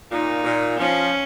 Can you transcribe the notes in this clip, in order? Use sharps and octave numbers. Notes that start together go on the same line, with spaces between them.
A#2 D#4
A#2
F3 C#4